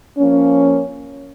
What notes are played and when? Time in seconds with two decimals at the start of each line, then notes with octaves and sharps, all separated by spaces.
0.17 F3 A#3 C#4